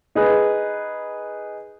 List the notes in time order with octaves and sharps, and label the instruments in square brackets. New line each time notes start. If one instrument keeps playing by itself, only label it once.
[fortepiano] D#4 G#4 B4